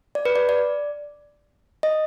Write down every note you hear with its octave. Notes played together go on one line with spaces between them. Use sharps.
D5
B4
D5
D5
D#5